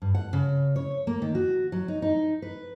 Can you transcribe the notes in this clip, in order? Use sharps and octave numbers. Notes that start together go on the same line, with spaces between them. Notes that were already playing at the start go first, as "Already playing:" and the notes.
G2
F#5
C#3
C#5
A#3
D#3
F#4
F#3
D#4
D#4
B4